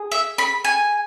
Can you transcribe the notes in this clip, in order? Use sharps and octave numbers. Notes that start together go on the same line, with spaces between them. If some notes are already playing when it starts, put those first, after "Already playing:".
Already playing: G#4
E5
B5
G#5